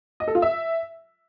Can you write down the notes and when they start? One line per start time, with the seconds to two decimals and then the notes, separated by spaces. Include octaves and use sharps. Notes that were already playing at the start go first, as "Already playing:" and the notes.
0.20 D#5
0.28 A4
0.35 F4
0.42 E5